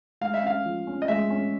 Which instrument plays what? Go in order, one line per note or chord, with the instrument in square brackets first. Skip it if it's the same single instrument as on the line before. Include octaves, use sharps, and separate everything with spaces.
[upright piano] G#3 [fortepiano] F5
[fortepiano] E5
[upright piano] C#4 [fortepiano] F5
[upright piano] F3
C#4
[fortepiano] D#5
[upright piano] G#3 [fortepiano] E5
[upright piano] C#4